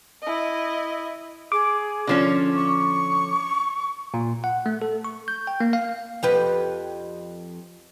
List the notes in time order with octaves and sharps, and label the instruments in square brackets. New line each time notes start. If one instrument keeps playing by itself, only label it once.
[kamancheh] E4 D#5
[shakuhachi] G#4 [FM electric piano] D6
[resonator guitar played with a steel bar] D3 F3 C#4
[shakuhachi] C#6
[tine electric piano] A#2
F#5
A3
A4
C#6
G6
G5
A#3
F5
[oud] F2 G4 B4